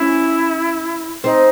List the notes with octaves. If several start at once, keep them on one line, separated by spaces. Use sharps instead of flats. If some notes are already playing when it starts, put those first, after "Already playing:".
Already playing: C#4 E4
C4 D#4